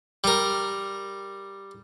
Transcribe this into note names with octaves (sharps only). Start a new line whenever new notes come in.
G3 A#4